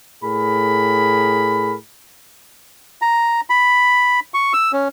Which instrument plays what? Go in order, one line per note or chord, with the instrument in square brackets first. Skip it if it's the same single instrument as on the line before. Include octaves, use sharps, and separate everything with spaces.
[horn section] A2 G#4 A#4 B5
[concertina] A#5
B5
C#6
E6
C#4